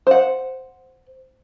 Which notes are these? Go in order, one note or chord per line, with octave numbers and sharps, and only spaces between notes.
C5 F#5